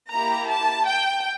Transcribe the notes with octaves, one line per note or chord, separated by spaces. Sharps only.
A#3 E4 G4 A#5
A5
G5